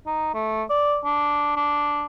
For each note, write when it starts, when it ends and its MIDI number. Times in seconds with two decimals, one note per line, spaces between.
0.06 0.31 63
0.34 0.63 57
0.70 0.98 74
1.05 1.52 62
1.56 2.06 62